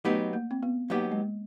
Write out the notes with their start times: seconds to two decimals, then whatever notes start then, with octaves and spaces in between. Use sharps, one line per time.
0.05 F#3 A3 B3 D#4 G4
0.33 A#3
0.51 C4
0.63 B3
0.90 F#3 A#3 B3 D#4 G4
1.12 G#3